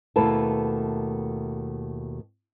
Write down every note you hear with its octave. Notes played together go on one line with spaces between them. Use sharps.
D#2 B2 A3 E4 B4 A5